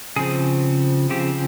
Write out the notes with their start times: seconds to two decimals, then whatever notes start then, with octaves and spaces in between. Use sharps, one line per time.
0.16 C#3 F3 C4 G#4
1.09 C#3 F3 C4 G4